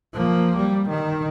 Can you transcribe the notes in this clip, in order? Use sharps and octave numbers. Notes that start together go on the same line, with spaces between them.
F3 A#3
G3
D#3